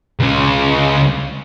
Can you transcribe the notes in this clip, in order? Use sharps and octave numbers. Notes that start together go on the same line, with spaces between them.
C#2 C#3